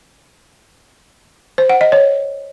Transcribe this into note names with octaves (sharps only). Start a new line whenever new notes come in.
C5
F#5
D#5
C#5